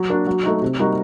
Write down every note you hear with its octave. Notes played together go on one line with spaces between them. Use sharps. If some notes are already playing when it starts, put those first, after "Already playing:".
Already playing: F#3
A#3 D4 F#4
F#3
A3 D#4 F#4
C3
G3 A#3 D#4 F#4